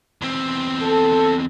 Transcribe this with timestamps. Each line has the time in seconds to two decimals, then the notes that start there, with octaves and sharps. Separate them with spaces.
0.22 E2 C4
0.82 A4